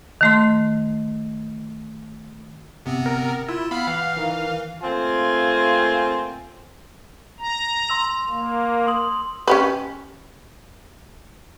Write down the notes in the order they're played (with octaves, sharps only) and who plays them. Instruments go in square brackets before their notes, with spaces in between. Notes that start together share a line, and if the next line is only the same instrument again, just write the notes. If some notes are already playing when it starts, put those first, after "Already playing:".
[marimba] D#3 A3 C6
[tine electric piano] G1 [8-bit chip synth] C3 B3 C4
[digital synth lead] A#4
[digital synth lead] E4 [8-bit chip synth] F4 [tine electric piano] E6
[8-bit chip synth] B3 F5 F6 [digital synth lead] B5
[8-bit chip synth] E3 [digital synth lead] F5 [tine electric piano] F#5 F6 C7
[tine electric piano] D#3 E4 A#4
[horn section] A3 A#3 C4 F4 G#5
[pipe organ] A#5
[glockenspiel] C6 E6 F7
[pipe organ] A#3
[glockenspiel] C6 D#6 F#7
[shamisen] C#4 G4 B4